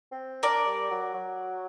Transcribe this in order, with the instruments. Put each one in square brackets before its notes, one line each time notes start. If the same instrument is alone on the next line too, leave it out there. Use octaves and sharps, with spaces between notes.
[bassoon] C4
[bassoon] D4 [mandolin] A#4 D5
[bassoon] G3
F#3
F#3